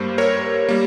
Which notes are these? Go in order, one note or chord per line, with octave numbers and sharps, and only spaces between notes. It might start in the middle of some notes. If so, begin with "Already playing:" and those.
Already playing: G2 G3 A#3 C5
A#4 C#5
G3 A#3